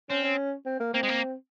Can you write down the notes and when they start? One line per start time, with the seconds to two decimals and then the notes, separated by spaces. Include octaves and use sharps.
0.10 C4 C#4
0.24 C#4
0.66 C4
0.80 A#3
0.94 A#3 C4
1.03 G#3
1.09 A#3